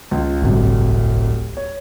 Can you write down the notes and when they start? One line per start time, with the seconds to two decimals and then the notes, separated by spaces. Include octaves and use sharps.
0.11 C#2 F4
0.42 D1 G1 C2
1.57 C#5